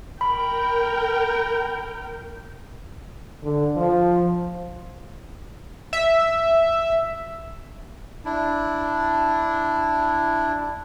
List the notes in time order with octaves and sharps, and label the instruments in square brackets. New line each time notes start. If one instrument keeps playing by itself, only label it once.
[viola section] A#4 G5 [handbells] B5
[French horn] D3
F3
[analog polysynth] E5
[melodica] D4 E4